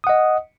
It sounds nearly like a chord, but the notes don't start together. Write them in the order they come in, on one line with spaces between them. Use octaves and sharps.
D#6 F#5 D#5